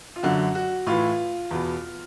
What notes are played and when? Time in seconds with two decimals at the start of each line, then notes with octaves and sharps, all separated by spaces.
0.16 F4
0.23 F#2 D3 F#4
0.55 F#4
0.86 A2 E3 F4
1.51 E2 B2